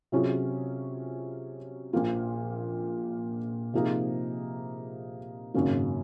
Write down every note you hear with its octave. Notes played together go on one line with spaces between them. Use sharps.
C3 F#3 C#4 F4 G#4
A#1 A#2 F3 A#3 F4
C3 F3 A#3 D#4 G#4
G#1 F#2 C#3 F#3 A#3